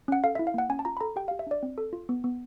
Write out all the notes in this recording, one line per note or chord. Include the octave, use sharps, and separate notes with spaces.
C#4 F#5
A4 F5
E5
E4
F5
A#3 F#5
C#4 G#5
A5
F4 A#5
B5
A4 A#5
G4 G5
F5
G4
E5
D4 D5
C4
A4
F4
B3
B3